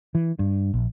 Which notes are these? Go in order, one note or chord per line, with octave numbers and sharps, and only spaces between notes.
E3
G2
A#1